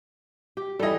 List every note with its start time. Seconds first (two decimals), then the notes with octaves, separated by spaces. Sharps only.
0.57 G4
0.79 E3 G3 A4 D#5